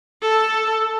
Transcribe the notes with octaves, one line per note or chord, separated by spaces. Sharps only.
A4